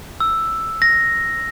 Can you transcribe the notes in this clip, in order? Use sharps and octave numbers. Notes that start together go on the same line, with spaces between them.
E6
A#6